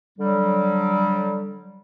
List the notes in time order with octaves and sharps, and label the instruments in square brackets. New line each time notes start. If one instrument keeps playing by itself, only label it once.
[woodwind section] D3 F#3 G3